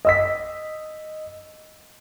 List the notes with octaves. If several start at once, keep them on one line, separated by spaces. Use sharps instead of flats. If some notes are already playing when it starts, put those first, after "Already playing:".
D#5 E6 B6